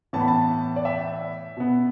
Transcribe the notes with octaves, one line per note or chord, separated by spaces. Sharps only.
A2 E3 B3 A5
B5
A5
D5
E5
B2 B3